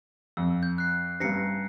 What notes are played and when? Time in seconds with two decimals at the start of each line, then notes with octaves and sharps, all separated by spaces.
0.37 F2 E6
0.63 G6
0.78 F#6 C7
1.20 A1 G2 A#6 C7 C#7